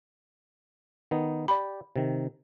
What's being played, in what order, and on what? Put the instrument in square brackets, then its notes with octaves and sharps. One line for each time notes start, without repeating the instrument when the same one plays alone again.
[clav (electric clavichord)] D#3 B3 D#4
[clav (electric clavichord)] G4 D5 [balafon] B5
[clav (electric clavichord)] C3 D#3